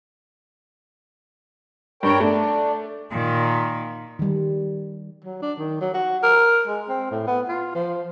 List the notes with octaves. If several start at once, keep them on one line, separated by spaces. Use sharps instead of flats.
G2 A#4 C#5 G5
A3 D4
A#2 D#3
D#3 G3
F#3
D4
D#3
F#3
F#4
A#4
G#3
C4
A2
B3
F4
F3